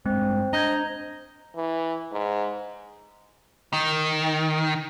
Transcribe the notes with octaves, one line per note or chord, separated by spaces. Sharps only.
G2 G#3 C4 C5
D4 D#5 A#5 G6 G#6
E3
G#2
D#3